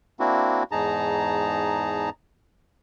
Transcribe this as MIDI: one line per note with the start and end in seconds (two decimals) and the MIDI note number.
0.20 0.63 58
0.20 0.63 60
0.20 0.63 62
0.20 0.63 64
0.20 0.63 66
0.71 2.10 40
0.71 2.10 44
0.71 2.10 63
0.71 2.10 68
0.71 2.10 81
0.71 2.10 82